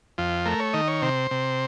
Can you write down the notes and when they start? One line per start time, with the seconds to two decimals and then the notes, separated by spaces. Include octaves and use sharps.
0.18 F2 F4
0.45 A3 A#4
0.60 C#5
0.73 D#3 D#5
0.88 C#5
1.02 C3 C5
1.31 C3